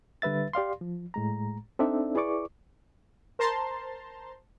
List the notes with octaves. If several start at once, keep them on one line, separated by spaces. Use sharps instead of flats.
D3 G3 B4 E5 A6
G4 D5 F5 C6
F3
A2 G#3 A#5
C4 D4 D#4 A4 D5 E5
E4 G#4 B4 D5 C#6 D6
A#4 C5 A5 A#5 C6